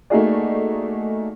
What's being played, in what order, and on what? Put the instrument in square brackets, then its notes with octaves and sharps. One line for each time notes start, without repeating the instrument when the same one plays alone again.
[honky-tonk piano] A3 A#3 D#4 F#4 G#4 D5